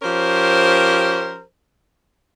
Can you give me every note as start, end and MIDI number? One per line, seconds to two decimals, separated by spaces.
0.02 1.42 53
0.02 1.42 61
0.02 1.42 67
0.02 1.42 70
0.02 1.42 72